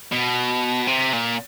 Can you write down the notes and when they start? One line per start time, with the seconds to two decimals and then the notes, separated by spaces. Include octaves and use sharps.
0.12 B2
0.87 C3
1.13 A#2